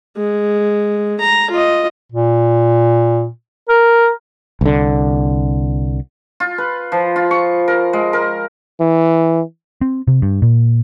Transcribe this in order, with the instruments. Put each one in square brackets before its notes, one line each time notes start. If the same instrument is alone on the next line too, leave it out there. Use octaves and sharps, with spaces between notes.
[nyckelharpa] G#3
A#5
F4 D#5
[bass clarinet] A#2
A#4
[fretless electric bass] C2 D3
[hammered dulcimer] F4
B4
F3
F4
C#6
A#4
G#3
A#4
[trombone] E3
[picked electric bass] C4
C3
G2
A#2